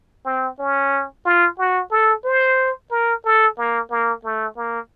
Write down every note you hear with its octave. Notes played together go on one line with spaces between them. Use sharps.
C4
C#4
F4
F#4
A4
C5
A#4
A4
A#3
A#3
A3
A#3